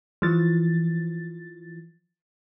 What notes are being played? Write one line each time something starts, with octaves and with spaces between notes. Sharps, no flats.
E3 F3 A6